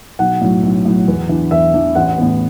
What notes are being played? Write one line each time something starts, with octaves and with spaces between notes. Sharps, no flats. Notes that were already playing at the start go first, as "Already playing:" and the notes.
B1 F#5
A2 F#3
B1
A2 F#3
E2
E3 D4
E2 E5
E3 D4
A1 F#5
A2 E3 B3